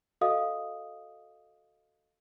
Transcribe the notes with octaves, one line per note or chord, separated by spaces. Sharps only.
F#4 A4 D#5 F5 D#6